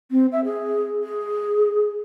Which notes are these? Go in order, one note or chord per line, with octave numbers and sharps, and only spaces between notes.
C4
E5
G#4
G#4